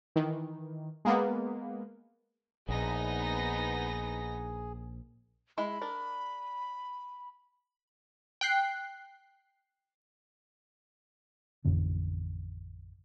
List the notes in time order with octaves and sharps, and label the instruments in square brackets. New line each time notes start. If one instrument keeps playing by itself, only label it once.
[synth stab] D#3 E3
G#3 A#3 B3
[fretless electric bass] A#1 [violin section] B3 D#4 A#6 [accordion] G#4
[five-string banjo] G#3 E4 [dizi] B5
[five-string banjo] D4 A#4
[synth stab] G5 F#6 C7
[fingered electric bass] A1 F2 D3 C#4